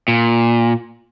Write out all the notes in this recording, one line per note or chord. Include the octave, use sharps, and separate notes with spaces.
A#2